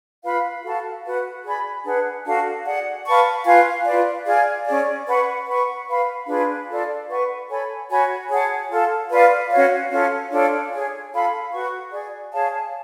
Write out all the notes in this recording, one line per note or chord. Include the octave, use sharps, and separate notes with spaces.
F4 B4 F5 B5
F#4 A4 F5 A5
F#4 B4 F#5
G#4 D5 G#5 B5
D4 G#4 B4 F#5
D4 F#4 A4 F5
G#4 D5 F#5
B4 F5 A5 C#6
F4 B4 F5 G#5
F4 B4 D5
G#4 D5 F5 G#5
C#4 G#4 D5
B4 F#5 C#6
B4 F#5 C#6
B4 F5 B5
D4 F4 G#4 B4
F4 A4 D5
B4 F#5 C#6
A4 C#5 G#5 B5
F#4 C#5 G#5 B5
G#4 C#5 F#5 A5
F4 A4 F5
F4 B4 D5 F5
C#4 F#4 C#5 F5
C#4 F4 A4
D4 F4 A4 C#5
G#4 C#5 G#5
F4 A4 F5 B5
F#4 B4 F#5 C#6
G#4 D5 G#5
G#4 C#5 F5 A5